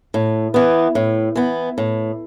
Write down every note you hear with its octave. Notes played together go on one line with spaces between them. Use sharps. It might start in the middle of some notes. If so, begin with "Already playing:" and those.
A2
E3 B3
A2
E3 B3
A2